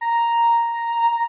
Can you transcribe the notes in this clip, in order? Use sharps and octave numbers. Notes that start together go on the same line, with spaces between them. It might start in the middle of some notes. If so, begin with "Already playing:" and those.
A#5